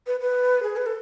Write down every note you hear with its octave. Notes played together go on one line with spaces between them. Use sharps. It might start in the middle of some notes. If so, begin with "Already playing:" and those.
B4
B4
G#4
B4
A4